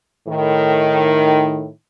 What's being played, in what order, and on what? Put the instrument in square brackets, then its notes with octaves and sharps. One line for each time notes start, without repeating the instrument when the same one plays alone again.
[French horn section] A2 D#3